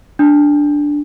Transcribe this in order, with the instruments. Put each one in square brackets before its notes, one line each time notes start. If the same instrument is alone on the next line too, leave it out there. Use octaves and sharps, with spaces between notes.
[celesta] D4